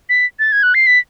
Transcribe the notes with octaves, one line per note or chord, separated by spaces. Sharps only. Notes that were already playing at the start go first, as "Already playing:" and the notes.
B6
A6
G#6
F#6
C7
B6